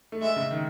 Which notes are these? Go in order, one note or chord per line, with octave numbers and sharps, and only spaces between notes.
A3
G#3 E5
C#3
D#3